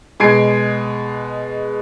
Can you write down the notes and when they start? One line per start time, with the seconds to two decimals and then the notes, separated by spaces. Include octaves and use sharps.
0.20 B2 G#3 G#5 G#6 C7 D7